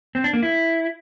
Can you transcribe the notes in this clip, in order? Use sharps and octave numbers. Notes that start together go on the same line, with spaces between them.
C4
D4
A#3
E4